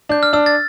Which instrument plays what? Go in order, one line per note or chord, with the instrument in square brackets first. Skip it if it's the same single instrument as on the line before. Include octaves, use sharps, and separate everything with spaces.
[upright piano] D4 [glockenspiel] G6
[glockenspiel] F6
[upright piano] D4 [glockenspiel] E6
[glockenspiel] A6